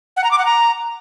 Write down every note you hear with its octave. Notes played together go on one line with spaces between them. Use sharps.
F#5
A#5
D6
F#5
A#5